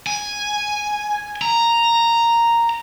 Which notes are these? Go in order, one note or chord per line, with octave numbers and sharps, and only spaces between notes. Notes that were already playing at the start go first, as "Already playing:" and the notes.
G#5
A#5